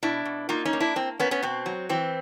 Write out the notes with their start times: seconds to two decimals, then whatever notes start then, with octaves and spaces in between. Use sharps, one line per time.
0.03 B2 D4 E4
0.25 B2
0.49 A#3 D#4 F4
0.65 C#4 D#4
0.73 A#3
0.80 D4 E4
0.96 A#3 C4
1.19 A#3 B3 C#4
1.31 B3 C#4
1.43 B2 C4
1.66 F#3
1.89 E3 C4